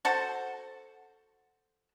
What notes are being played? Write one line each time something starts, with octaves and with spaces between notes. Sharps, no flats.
F#4 A4 C5